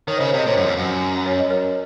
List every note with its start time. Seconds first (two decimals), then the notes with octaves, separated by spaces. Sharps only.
0.07 D#3 A#4 C#5
0.17 C#3 C5 D#5
0.27 A#4 C#5
0.34 C3 C5 D#5
0.46 A#2 A#4 C#5
0.57 F#2
0.66 F2
0.77 F#2
1.26 C#5
1.39 D#5
1.50 A#4 C#5